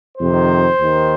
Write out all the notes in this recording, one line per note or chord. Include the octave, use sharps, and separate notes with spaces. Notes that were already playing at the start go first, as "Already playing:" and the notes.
F2 C3 D#3 C5
D#2 D#3